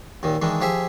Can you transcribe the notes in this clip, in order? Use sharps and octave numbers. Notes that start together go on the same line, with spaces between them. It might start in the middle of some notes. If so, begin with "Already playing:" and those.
D#2 A#2 D#3
D#3 E3 G#3 D4
F3 G4 G#4 E5